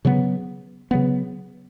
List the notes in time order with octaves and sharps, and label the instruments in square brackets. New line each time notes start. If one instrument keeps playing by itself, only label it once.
[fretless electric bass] C#3 F#3 B3
C#3 F#3 B3